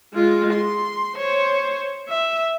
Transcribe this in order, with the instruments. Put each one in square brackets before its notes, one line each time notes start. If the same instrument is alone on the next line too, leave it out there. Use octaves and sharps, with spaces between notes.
[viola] G#3 F4
C6
C5 C#5
E5